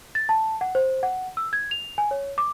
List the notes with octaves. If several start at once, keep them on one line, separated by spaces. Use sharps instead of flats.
A6
A5
F#5
C5
F#5
E6
G#6
F7
G#5
C#5
D6